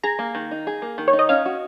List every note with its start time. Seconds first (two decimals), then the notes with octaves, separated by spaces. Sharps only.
0.03 G#4 A#5
0.19 A#3
0.35 D#3
0.51 D#4
0.67 G#4
0.82 A#3
0.98 D#3
1.08 C#5
1.13 D#4
1.19 D#5
1.29 C#4 F5
1.46 F#4